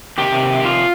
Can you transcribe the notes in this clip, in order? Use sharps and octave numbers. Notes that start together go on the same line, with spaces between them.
C3 D#3 G4
F4